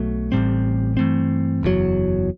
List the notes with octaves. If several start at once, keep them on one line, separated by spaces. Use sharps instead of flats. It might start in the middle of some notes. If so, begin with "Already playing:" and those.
Already playing: B1 B2 F#3 A3
A1 A2 G3 C4
G2 E3 A3 C4
F#1 E2 C3 F#3